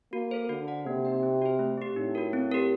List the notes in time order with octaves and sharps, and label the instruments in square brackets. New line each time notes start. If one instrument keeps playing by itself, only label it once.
[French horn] A#3 [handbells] F#4
[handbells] A4 C5
[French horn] D3 [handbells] F#4
[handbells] C5 F#5
[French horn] C3 [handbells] A#3
[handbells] D#4 G4 D5 G5
C4
F#4 C5
A3
C4 G4
[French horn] A2 [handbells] D#4
[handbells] F#4 A#4
C4
G4 A#4